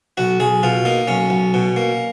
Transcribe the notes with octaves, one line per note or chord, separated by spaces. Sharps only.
B1 F#4
B1 G#4
B2 F4
A#3 D#4
B1 C#4
B1
B2
A#3